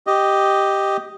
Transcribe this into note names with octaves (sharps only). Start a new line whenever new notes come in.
G4 D#5